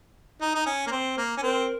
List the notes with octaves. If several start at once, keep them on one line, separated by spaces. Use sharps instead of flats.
D#4
D#4
C#4
A#3
C4
A#3
C#4
C4 A#4